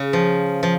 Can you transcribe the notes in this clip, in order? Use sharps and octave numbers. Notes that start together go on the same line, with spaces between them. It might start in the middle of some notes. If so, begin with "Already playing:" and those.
Already playing: C#3
F3
F3